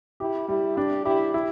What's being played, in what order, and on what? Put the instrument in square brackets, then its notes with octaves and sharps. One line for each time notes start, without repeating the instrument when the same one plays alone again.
[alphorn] E4 [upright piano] G4
[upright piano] G3 [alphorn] E4
[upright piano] D4 [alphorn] G4
[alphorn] E4 [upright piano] G4
[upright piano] E4